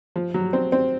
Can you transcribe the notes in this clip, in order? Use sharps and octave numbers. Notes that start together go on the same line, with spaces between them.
F3
F#3
C4
C4